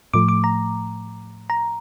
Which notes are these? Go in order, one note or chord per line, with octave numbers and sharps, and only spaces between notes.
A2 F3 A3 D6
D6
A#5
A#5